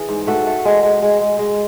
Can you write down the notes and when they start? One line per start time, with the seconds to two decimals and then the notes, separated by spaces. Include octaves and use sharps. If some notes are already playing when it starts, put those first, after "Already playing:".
Already playing: E3 G#4
0.09 G#2
0.27 A3 F#4 A4
0.47 A3
0.65 G#3
0.83 G#3
1.02 G#3
1.21 G#3
1.39 G#3